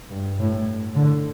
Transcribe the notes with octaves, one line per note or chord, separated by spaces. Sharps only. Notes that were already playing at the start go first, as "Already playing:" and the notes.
G2
A2
D3